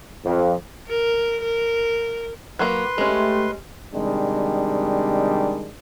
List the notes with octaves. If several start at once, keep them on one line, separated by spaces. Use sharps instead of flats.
F2
A#4
A#4
F#3 A#3 B4 C6
G#3 A3 C#4 G4
C3 D#3 G3 G#3 D4